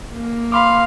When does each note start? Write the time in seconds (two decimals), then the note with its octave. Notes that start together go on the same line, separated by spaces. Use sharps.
0.14 A#3
0.52 F5 B5 C6 D6